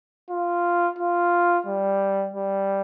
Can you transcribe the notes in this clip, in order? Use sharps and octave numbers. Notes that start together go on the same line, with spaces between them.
F4
F4
G3
G3